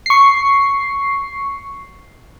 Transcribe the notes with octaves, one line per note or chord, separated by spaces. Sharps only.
C#6 C7